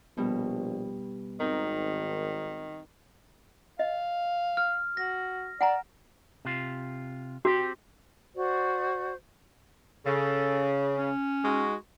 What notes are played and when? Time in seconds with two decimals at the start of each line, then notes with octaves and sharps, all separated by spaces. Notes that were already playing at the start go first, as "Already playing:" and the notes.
0.17 A#1 B2 G3
1.40 G#1 D#3 C4 D#4 A#4
3.79 D#5 F5
4.57 F6
4.97 F#4 A#6
5.61 D5 F#5 G#5 A#5
6.45 C3 F4
7.45 C4 F#4 G4
8.36 F#4 C5 D5
10.06 C#3 A4
10.97 C#4
11.44 G#3 D#4 F#4